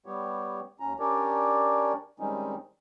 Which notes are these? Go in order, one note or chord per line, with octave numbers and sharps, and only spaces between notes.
G3 B3 G4 C#5
D#2 C#4 A#5
C#4 D4 G4 A#4 C#5 D5
D#3 G3 G#3 C4 C#4 D#4